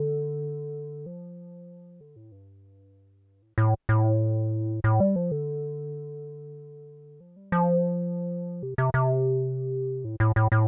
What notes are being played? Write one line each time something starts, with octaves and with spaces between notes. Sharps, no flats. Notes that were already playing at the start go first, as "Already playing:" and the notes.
Already playing: D3
F3
D3
A2
G2
A2
A2
A2
A2
G3
F3
D3
F3
G3
F3
C3
C3
C3
A2
A2
A2
A2